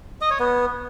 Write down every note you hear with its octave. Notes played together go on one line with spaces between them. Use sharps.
D#5
C#5
B3